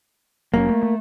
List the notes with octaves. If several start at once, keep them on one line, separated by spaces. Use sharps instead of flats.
F1 F#3 A#3 C#4
A3
A3